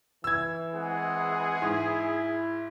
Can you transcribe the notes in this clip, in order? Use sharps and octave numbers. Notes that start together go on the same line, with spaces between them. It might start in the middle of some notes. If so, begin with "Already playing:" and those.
E3 E6 G#6
G#3 C4 G#4 F#5
G#2 E4